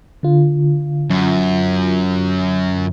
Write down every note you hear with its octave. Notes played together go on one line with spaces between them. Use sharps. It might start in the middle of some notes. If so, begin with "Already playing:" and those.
D3 F4
F#2